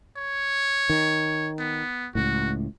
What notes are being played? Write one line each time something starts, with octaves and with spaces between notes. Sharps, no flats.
C#5
D#3
B3
C#2 A2 F#4